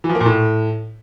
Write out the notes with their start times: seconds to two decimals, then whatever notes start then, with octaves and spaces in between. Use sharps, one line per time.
0.04 E3
0.09 F3
0.15 A#3
0.20 A#2
0.26 A2